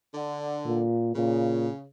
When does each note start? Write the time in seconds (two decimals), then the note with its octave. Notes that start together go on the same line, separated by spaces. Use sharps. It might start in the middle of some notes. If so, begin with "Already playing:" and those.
0.14 D3
0.65 A#2
1.15 A#2 C#3